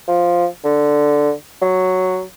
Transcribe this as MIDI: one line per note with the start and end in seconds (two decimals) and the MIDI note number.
0.08 0.46 53
0.65 1.32 50
1.62 2.21 54